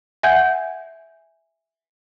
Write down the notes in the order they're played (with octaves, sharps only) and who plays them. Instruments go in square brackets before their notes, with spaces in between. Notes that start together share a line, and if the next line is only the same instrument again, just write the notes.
[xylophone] E5 F#5 G#5 G6 G#6